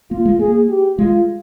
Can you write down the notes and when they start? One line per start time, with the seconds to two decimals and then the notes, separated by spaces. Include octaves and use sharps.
0.11 A#3 F4
0.25 G#3
0.39 A#3 G#4
0.69 G4
0.98 G#3 F4